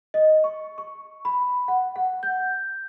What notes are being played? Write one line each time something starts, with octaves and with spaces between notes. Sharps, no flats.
D#5
C#6
C#6
B5
F#5
F#5
G6